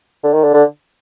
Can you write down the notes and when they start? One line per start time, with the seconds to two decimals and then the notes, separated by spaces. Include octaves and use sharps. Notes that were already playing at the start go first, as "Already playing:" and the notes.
0.24 D3
0.34 D#3
0.44 D3
0.54 D3